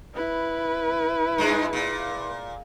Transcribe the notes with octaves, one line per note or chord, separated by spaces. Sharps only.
E4 B4
G2 G#3
A#2